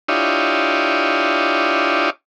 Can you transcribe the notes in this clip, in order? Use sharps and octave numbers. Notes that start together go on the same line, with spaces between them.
D4 E4 F4 G4 C#5 D#5